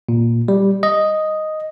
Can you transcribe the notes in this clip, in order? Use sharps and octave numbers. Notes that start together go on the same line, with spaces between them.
A#2
G3
D#5